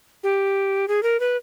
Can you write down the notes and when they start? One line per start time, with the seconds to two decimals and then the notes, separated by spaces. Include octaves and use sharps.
0.23 G4
0.88 G#4
1.03 A#4
1.20 B4